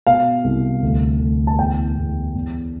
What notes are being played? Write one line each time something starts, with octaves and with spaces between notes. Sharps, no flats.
B2 F5
C2
D2
D2
A5
E2 G5
E2
E2